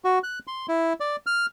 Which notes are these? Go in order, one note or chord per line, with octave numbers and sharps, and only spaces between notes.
F#4
F#6
C6
E4
D5
F6